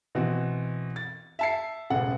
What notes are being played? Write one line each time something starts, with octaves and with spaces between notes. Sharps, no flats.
B2 E3 C4 F#4
A6
E5 A5 C7
E1 A1 C#3 A4 F#5